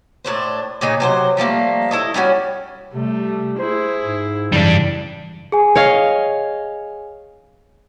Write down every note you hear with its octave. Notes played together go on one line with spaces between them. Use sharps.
A2 C#3 D4 C5
A#2 C#3 D#4
C3 F#3 C5
F3 G3 A3 A#3
E4 A4 D#5
G3 A3 C#4 F#4
C3 G3 A3
E4 G#4 C5
G#2
F#2 C#3 E3 G3 D4
G#4 G#5
C#5 D#5 F5